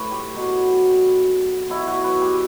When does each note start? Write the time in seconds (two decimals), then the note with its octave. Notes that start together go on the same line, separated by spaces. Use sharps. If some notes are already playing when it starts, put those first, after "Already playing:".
Already playing: A2 B4 C#5
0.11 G4
0.34 B2 F#3
1.70 B2 F#3 E4
1.87 F#4
2.04 B4
2.21 G4